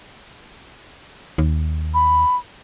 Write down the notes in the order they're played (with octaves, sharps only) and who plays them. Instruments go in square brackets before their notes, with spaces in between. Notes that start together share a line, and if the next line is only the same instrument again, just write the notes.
[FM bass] D#2
[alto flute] B5